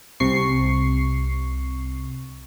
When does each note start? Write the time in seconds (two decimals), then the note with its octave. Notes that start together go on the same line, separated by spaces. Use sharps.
0.20 C2 C3 C#6 C7